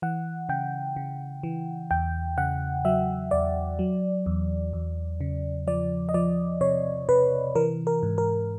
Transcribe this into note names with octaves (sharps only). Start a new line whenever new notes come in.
E3 F#5
C#3 G5
C#3
E3
E2 G5
C#3 F#5
F#3 E5
E2 D5
F#3
E2
E2
C#3
F3 D5
D#5
F3 D5
C3 C#5
C3 B4
E3 A#4
A#4
G#2
A#4